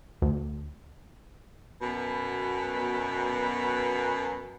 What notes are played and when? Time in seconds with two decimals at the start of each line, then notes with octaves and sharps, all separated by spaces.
0.22 D2
1.82 F#2 B2